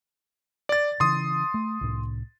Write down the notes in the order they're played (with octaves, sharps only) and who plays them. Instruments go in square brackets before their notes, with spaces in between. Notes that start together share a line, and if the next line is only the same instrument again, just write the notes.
[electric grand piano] D5 A6
[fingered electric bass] C#3 E3 [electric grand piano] C6 D#6
[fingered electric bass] A3
C2 A2